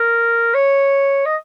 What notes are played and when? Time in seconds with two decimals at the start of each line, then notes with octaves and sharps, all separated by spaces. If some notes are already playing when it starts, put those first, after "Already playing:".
Already playing: A#4
0.54 C#5
1.25 D#5